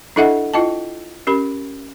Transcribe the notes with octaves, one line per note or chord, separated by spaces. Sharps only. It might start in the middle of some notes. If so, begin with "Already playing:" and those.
D4 E4 A4 D#5 E5 F#5
E4 F4 D#5 G5 A5
C#4 G4 A#4 B5